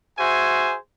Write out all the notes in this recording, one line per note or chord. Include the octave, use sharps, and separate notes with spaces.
F#4 G#4 C5 E5 G#5